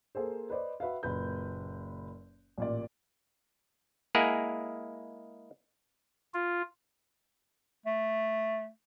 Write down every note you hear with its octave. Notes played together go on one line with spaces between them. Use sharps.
A#3 G#4 A4 C5
B4 C5 D5 D#5
F#4 B4 E5 F5
F#1 A#2 B4 G6
A1 A#2 D5
G#3 A#3 E4 G#4 A#4 F#5
F4
A3